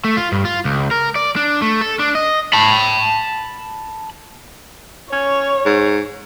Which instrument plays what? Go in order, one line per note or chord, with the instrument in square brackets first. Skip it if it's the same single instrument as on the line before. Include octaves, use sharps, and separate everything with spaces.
[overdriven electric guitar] A3
F4
G2
F4
C#2
A#4
D5
D4
A3
A4
D4
D#5
A5 B5
[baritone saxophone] C#4 [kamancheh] C#5
[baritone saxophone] G#2